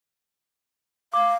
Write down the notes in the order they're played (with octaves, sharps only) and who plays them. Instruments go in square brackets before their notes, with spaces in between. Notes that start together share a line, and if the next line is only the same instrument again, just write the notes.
[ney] F5 [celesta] D6